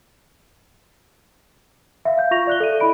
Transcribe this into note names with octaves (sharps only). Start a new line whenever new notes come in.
E5 F5
F5 G6
F4 C#6 A#6 F7
D5 F#6 G7
A4 E5 D#7
E4 D#5 B5 D7